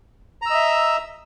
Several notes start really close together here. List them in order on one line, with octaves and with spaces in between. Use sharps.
A#5 E6 D#5 E5